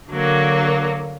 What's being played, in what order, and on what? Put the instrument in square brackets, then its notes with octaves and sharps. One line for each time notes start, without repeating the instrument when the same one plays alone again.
[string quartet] D3 F#3 A#3